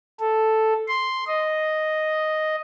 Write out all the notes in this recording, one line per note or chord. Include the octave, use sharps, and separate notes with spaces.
A4
C6
D#5